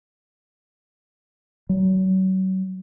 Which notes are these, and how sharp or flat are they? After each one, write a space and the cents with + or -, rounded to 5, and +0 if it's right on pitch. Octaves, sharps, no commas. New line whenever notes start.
F#3 +35